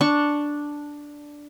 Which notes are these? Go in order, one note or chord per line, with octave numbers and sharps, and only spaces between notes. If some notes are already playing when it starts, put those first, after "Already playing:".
D4 C#6